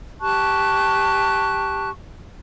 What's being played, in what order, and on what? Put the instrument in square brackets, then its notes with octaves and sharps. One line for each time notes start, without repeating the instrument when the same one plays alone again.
[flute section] G4 A5 C#6 F#6